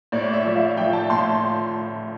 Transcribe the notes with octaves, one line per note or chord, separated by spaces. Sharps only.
A2 D5
E5
F3
F5
F3 G5
A5
A2 C6